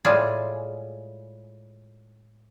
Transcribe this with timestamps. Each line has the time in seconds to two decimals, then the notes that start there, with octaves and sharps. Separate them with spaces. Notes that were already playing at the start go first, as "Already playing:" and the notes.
0.05 A2 G3 G#3 F4 G#4